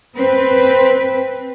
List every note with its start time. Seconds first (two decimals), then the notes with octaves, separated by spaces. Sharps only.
0.16 C4 B4